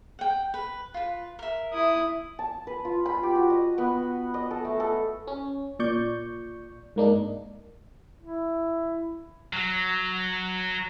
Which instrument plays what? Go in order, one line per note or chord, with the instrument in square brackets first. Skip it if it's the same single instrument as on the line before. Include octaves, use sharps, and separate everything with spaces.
[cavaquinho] F#5 G5
B4
F4 B4
A#4 E5
[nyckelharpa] E4 D#6
[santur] A5
B4
F4
B5
G4
F#4
D#5
B3
D#5
A4
A3
A4
[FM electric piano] C#4
A#2 D5 C#6 G6
G#2 A#3 D4 D#4
[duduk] E4
[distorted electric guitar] F#3